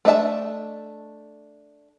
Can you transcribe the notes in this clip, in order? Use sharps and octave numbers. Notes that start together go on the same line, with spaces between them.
A3 D4 D#5 E5 A5